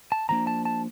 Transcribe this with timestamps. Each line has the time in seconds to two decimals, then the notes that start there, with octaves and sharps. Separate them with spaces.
0.12 A5
0.29 F2 D3 F3 A#3 D4 A#5
0.47 A5
0.65 A5